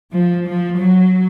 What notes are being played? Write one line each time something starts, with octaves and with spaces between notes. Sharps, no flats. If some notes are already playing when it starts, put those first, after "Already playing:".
F3
F3
F#3